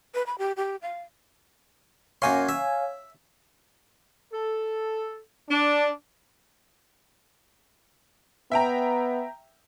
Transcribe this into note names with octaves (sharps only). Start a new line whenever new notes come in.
B4
B5
G4
G4
F5
F#2 A#3 C#5 F5 G#5 C6
E5
A4
D4
B3 E5 G5 A#5